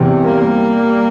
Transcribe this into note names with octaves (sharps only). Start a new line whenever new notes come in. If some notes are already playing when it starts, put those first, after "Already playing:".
Already playing: E2 C3
G3 A#3